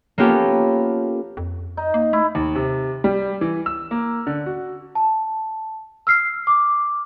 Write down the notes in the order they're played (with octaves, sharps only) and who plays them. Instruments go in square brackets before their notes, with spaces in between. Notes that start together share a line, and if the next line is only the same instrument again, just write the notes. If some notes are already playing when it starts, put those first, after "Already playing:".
[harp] A#3 B3 C#4 F4 G4 A4
[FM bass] F2
[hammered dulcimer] D#4
[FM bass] A#3
[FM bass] A3 [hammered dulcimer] E4
[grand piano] D#2
C3
G3
E3
E6
A#3
D3
F#4
[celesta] A5
E6 F6 C7
D6